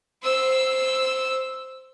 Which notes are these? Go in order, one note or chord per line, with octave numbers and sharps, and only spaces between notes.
C5 E6